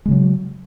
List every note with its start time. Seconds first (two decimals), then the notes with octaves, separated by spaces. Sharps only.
0.06 G#3
0.08 C#3
0.11 F#3